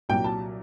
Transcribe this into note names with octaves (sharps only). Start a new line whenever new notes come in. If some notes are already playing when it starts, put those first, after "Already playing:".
C2 A#2 F#3 G5
A5